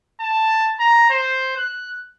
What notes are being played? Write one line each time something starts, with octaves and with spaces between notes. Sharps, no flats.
A5
A#5
C5
F#6